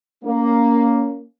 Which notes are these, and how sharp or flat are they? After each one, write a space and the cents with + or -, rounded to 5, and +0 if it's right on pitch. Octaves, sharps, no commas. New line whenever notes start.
A#3 +0 C#4 +20